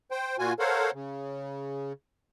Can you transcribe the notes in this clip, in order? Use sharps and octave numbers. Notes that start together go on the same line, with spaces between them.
C5 G5
A#2 F4 F#4 G#5
A4 A#4 C5 C#5 F5 F#5
C#3